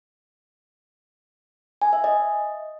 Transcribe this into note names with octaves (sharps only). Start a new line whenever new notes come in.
G#5
E5
D#5